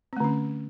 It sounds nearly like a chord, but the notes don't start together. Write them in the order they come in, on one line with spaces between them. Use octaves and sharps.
C4 A3 D3 C#4